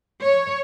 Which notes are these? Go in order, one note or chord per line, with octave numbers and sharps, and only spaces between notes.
C#5